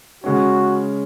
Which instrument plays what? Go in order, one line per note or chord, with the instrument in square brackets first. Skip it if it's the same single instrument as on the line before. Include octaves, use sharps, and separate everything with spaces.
[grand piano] C#3 G#3 C#4 [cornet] F#4